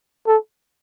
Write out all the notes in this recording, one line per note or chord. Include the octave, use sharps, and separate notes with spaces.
A4